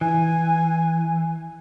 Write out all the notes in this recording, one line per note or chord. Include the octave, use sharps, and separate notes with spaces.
E3 G#5